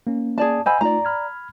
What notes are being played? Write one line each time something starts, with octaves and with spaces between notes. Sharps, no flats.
A#3 C#4
G#4 D5 A5
C5 D#5 F#5 G#5 B5 E6
A3 D#4 F4 D5 A#5
B5 F6 G#6